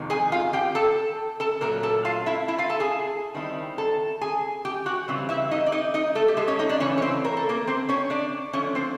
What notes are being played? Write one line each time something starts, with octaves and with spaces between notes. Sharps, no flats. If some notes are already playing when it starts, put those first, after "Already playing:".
Already playing: F2 C3 D#3 G#3
G#4 G#5
F4 F5
G4 G5
A4 A5
A4 A5
A#2 F#3 A3 A#4 A#5
A4 A5
F4 F5
E4 E5
E4 E5
F4 F5
A4 A5
G#4 G#5
D#3 G3 C4 E4
A4 A5
G#4 G#5
G4 G5
F#4 F#5
C#3 E3 G3 C4
E4 E5
D#4 D#5
D5
D#4 D#5
D#4 D#5
A3 A4
G4
G#3 G#4
C#4 C#5
D#4 D#5
D4 D5
C#3 E3 A3 C#4 C#5
C#5
C4 C5
A#4
A4
A#3 A#4
C4 C5
C#4 C#5
D4 D5
D3 F3 A3 C#4 C#5
C4 C5